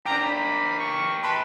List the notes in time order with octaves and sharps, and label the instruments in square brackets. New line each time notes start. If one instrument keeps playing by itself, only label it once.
[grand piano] D4 G5 [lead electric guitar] G4 A#4 [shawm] A#5
[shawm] B5
C#6
[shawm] B4 [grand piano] A5 B5 C6